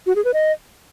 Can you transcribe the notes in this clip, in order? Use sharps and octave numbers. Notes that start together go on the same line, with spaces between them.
F#4
G#4
B4
D#5